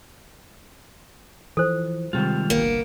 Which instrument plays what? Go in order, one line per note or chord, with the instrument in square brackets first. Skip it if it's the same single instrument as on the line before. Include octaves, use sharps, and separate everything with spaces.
[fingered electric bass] E3 F3 [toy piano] A4 C5
[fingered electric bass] C3 G#3 [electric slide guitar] D#3 G3 F4
[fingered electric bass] G1 C2 G2 [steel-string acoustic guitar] A#3 B3